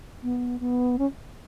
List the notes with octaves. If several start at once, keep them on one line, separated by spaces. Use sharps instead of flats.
B3
B3
C#4